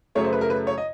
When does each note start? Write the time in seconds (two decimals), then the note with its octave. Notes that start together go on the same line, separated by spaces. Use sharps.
0.15 F#2 C#3 F#3 A3 C#5
0.25 C5
0.33 B4
0.41 A#4
0.50 B4
0.67 C#5
0.78 D#5